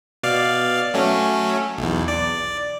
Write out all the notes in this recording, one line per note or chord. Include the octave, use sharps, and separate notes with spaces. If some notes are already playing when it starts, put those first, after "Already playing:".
B2 D5 F5
F#3 A3 C#4
B1 E2
D5